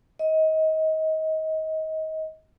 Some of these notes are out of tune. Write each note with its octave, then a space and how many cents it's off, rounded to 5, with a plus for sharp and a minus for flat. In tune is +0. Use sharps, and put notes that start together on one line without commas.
D#5 +25